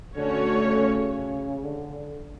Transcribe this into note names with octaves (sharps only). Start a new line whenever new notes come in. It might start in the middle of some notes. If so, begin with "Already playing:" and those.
D3 A3 C#4 F#4 C#5
C#3
D3